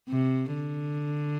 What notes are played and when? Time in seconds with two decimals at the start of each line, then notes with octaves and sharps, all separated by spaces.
0.09 C3
0.53 D3